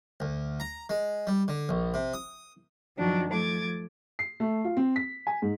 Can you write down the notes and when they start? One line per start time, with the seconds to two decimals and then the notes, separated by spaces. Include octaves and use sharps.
0.20 D2
0.60 A#5
0.89 G#3
1.27 G3
1.48 D3
1.69 A#1
1.94 C3
2.14 D#6
2.96 F#2 D#3 F3 F#3 D4
3.29 F3 A3 D6 G#6 A6
4.19 C7
4.40 A3
4.64 F4
4.77 C4
4.96 B6
5.27 G#5
5.42 G#2